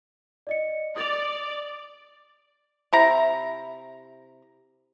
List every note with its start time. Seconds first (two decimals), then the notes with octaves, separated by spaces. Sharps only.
0.47 D5 D#5 C#7
0.96 D5 D#6 A6 F7
2.93 C3 E4 A#5